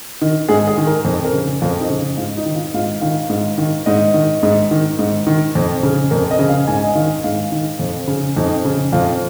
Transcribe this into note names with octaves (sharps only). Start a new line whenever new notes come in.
D#3
G#2 G#4
G#4
D#3
A#4
F2
A#4
C#3
F2 F4
D#4
C#3
G#2 F4
D#4
D#3
F4
G#2 F4
D#3 F5
G#2
D#3
G#2 D#5
D#3
G#2
D#3
G#2
D#3
F2
C#3
F2 A#4
D#5
C#3
F5
G#2 G#5
D#5
D#3 F5
G#2 F5
D#3
F2
C#3
F2 D#4
C#3
F2 F4